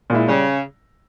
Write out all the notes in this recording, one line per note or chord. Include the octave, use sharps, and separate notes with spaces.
A#2 G#3 E4
C#3 G3